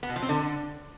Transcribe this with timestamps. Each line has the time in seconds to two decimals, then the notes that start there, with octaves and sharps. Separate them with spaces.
0.03 B3
0.09 B2
0.16 F3
0.22 C4
0.29 D3